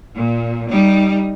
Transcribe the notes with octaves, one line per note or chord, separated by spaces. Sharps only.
A#2
G3 D#4